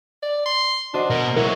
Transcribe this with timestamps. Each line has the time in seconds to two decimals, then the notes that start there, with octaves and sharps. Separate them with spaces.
0.23 D5
0.46 C6
0.94 D4 F#4 C5 D#5
1.10 B2 A#4
1.37 F#3 G#3 E4 F#4 A#4